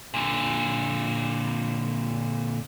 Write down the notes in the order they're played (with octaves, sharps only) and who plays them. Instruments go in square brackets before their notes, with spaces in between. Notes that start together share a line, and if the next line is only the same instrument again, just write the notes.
[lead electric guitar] A#2 D3